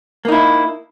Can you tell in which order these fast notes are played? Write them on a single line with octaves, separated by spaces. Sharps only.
A#3 D#4 E4